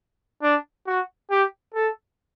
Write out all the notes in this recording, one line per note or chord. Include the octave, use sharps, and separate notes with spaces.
D4
F#4
G4
A4